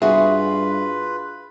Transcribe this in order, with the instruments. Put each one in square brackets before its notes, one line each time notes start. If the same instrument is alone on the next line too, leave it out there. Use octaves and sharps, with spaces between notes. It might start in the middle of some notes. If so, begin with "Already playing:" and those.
[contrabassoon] G2 [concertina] F4 B4 B5 [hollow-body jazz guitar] F#4 G#4 [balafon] E5